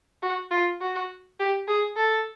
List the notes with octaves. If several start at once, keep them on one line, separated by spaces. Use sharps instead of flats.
F#4
F4
F#4
G4
G#4
A4